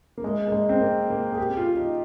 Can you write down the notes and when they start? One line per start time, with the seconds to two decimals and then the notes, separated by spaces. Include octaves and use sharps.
0.18 A#3
0.24 G#3
0.48 A#3
0.52 G#3
0.69 C4
0.81 A#3
1.10 A#3
1.32 G#4
1.38 G4
1.57 F4
1.77 D#4